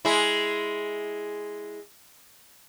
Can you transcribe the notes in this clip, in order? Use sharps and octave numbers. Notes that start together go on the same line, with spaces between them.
G#3 E4